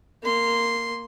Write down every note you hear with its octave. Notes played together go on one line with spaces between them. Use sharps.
A#3 C6